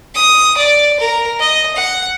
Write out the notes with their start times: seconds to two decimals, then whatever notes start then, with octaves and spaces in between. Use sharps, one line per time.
0.15 D#6
0.57 D5
1.00 A#4
1.39 D#5
1.76 F#5